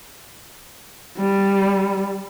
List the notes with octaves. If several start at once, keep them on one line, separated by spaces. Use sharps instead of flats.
G3